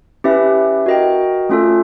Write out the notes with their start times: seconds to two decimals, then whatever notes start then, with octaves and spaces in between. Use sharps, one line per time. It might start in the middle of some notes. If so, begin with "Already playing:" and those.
0.24 C#4 E4 G4 B4 E5
0.86 F#4 A#4 D#5 G5
1.49 A3 C#4 F4 A4